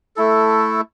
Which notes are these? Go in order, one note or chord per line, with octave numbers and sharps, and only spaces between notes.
A3 E4 A4